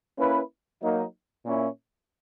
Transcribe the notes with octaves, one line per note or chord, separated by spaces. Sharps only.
A#3 C#4 E4 B4
F#3 A#3 D#4
A#2 A#3 C#4 E4